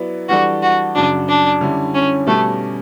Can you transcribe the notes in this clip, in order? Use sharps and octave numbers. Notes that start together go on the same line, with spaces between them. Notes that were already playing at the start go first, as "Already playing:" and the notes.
Already playing: F#3 B3 E4 B4 D5
E3 G3 D4 F#4 A4 D5
F#4
F#2 C#3 F#3 D4
D4
D3 G3 C#4 E4
C#4
B2 G3 A3 C#4